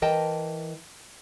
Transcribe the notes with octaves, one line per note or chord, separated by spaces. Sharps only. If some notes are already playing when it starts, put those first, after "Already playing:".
E3 A#4 D#5 G5 A5